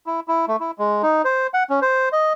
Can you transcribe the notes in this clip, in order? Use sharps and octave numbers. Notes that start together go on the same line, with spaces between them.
E4
E4
A3
E4
G#3
D#4
C5
F#5
C#4
C5
D#5